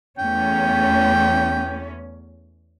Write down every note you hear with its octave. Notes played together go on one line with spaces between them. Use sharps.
E2 A3 C#4 G5